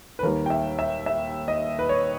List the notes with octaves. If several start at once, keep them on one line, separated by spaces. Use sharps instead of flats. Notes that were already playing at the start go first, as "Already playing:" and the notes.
B4
D#2 D#3 G3 A#4
G5
E5
E5
E5
D#5
B4
C#5